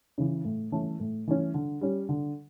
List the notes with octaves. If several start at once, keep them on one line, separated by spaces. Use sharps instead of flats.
C#3 E3
A2
E3 A3 C#4
A2
E3 A3 C#4
D3
G3 C#4
D3